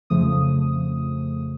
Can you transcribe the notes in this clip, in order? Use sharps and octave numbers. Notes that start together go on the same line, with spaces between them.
F2 C#3 F3 A3 D#6